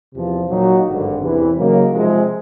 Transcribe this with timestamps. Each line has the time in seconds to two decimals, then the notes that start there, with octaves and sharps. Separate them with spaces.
0.14 E2 C3 F3
0.49 A#2 F#3 A#3 D#4 F#4
0.85 G#1 G2 D3
1.20 E2 C3 E3
1.56 C#3 F#3 A#3 D#4
1.92 C3 F3 G#3